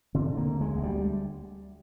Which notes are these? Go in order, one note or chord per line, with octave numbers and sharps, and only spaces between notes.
D3 C4
A#3
D2
G#3
D2
G3